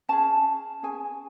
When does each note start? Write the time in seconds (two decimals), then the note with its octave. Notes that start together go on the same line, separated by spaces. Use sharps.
0.09 C#4 G#4 A5
0.83 C#4 G#4 G#5